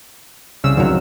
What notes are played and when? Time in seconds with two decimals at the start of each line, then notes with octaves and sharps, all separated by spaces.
0.64 C2 C#3 E6
0.77 F2 D#3 F#3